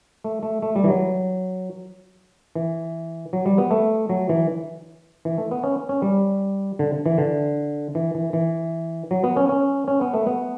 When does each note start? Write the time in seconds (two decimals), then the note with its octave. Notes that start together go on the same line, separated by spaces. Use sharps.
0.24 A3
0.43 A3
0.62 A3
0.76 G3
0.84 E3
0.88 F#3
2.55 E3
3.33 F#3
3.46 G3
3.58 B3
3.71 A3
4.09 F#3
4.29 E3
5.25 E3
5.38 A3
5.51 B3
5.63 C#4
5.89 C#4
6.02 G3
6.79 D3
7.06 E3
7.18 D3
7.95 E3
8.15 E3
8.33 E3
9.11 F#3
9.24 B3
9.37 C#4
9.49 C#4
9.88 C#4
10.01 B3
10.14 A3
10.27 B3